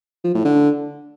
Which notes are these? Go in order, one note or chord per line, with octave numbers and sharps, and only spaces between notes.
F3
A2
D3